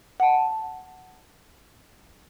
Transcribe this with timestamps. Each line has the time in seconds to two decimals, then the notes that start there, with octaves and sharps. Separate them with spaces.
0.20 F#5 A5